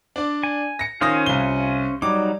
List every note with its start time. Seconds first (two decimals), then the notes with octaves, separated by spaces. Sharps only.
0.16 D4 D5
0.43 G#5
0.79 A#6 C#7
1.01 D#3 C#4 F4 C5 F5 G#5 D#6 A#6
1.26 C2 G7
2.02 F#3 G3 D#4 D6